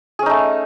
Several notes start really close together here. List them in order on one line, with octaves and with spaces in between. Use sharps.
G#4 C#4 D#4 A3